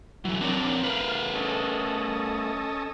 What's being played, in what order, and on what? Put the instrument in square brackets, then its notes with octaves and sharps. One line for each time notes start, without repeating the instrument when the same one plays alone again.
[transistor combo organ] E3 [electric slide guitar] F#3 A3
[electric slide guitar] C4 A#4 C#5 [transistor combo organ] D4
[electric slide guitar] A3 A#4 B4 [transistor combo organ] F5
[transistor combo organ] C#4 A4 D#5